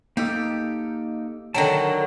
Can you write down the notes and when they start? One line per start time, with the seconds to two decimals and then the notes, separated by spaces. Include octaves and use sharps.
0.17 A#3 D#4 G4 A4
1.54 D3 D#3 F#3 G5 A5